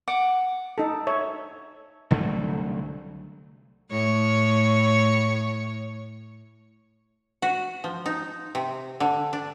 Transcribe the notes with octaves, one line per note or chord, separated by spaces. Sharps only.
F#5 D6
D#4 A4
C#5 E5
C2 D3 F#3 A3
A2 C#5
F#4
F3
D#4
C3
D3
D4